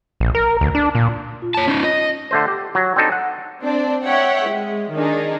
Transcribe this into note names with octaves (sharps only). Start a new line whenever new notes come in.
A#1
A#4
D2
D4
A#2
F4
C#5 A5
C#4 D#4
D#5
D3 A3 C5
G4
F#3
C4 D4 D#4 A4
F#5
C4 D4 D5
C#5 E5 F#5 G5
G#3
D#3 D4 D#4 G#4